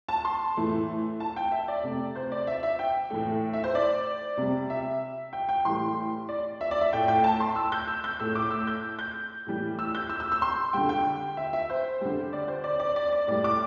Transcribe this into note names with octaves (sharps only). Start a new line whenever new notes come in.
A5
C6
A2 E3 A3
A5
G5
E5
D5
C3 A3
C5
D5
E5
E5
G5
A2 E3 A3
E5
C5
D5
C3 G3
E5
G5
G5
A2 E3 G3 C6
D5
E5
D5
E5
A2 A3 G5
G5
A5
C6
E6
G6
E6
G6
A2 A3 E6
D6
E6
G6
G6
A2 E3 G3
E6
G6
E6
E6
E6
C6
D3 G3 G5
G5
E5
E5
C5
D3 G3
D5
C5
D5
D5
D5
D5
A2 G3 D5
D6